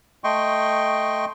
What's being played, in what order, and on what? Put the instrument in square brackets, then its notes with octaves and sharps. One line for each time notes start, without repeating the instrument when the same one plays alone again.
[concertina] A3 D#5 G5 C6 C#6